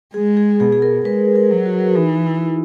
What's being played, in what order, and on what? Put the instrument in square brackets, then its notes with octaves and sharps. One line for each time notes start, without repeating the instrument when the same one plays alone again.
[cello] G#3 [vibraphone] G#4
[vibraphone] G#4
[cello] B2 [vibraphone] G#4
[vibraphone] G#4
A#4
[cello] G#3 [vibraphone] B4
[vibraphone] A#4
[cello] F#3
[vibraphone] F#4
[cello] E3 [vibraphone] D#4
[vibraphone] E4